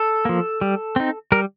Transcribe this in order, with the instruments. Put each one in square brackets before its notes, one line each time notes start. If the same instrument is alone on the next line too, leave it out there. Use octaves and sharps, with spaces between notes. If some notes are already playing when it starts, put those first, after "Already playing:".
Already playing: [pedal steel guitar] A4
F3 A#3
G3
C4 D#4
G3 A#4